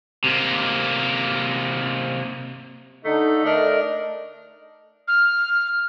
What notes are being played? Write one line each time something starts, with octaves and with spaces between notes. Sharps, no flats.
C3 A#3
D3 A3 D#4
A3 D4 A#4 D#5
F6